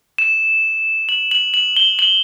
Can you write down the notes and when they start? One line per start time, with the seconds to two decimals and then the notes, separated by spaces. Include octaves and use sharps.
0.18 E7
1.09 F#7
1.31 F#7
1.54 F#7
1.77 G7
1.99 F#7